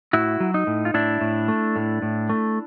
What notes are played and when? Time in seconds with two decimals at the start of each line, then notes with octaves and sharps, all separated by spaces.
0.13 A2 E4 F#4
0.40 F#3
0.54 D#4
0.67 A2
0.85 F4
0.94 A2 D4 E4
1.21 A2
1.48 A3
1.76 A2
2.02 A2
2.29 A3